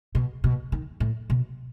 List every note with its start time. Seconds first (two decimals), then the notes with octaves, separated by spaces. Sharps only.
0.15 B2
0.44 B2
0.72 D#3
1.00 A2
1.30 B2